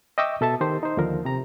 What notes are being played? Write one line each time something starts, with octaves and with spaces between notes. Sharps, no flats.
D#5 E5 G5 C#6 D6 E6
B2 A4 E5 A5
D#3 G4 C5
D#4 C5
D#2 D3 F3 A#4
C3 A#5